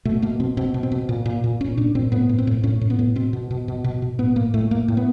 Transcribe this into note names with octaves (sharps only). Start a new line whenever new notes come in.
B2 A3
B2 A#3
B2 C4
B2 C4
B2
C4
B2
A#2
A#2
A#2
A#2 C#4
A#2 D4
A#2 C4
A2 B3
A2
C4
A2
A2 C#4
A2
B3
A2
B2 C4
B2
B2
B2
B2
B2
A2 B3
A2 A#3
A2 A3
A2 A#3
A2
B3